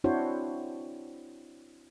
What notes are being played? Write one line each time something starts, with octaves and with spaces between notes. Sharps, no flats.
C4 D4 E4 F#4 C5 C#5